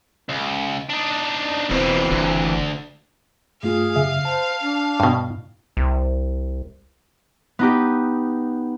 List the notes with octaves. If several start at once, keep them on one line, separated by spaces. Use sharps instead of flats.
C#2
D4 D#4
E1 F2 B2 E3 C4
F#1 D2
G2 A3 F4 G#4 F5
F#2 C#3 E5
C5 A5
D4
G2 B2
C2
B3 D#4 G4